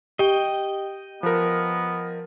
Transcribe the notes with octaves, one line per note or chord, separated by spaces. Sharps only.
G4 D#5 G5
F3 B3 A#4